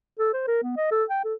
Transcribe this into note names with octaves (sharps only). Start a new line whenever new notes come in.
A4
C5
A#4
B3
D#5
A4
G5
A4